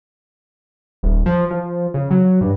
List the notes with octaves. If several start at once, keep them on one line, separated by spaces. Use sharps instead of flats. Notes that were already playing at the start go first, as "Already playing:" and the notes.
D#1
F3
F3
C#3
F#3
G2